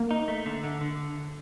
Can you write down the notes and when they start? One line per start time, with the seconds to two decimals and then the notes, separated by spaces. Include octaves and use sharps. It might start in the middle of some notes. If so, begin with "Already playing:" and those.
Already playing: A#3
0.11 D#4
0.28 A3
0.46 D3
0.64 D3
0.81 D3